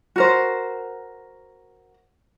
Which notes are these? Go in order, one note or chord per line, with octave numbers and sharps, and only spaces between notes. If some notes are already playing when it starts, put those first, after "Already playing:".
F#4 A#4 C5